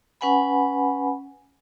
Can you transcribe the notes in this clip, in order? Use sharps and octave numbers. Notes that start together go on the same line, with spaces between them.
C#4 B4 F#5 G#5 B5